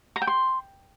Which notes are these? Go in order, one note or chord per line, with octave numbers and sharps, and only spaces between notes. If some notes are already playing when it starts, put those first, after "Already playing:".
A#5
G5
C6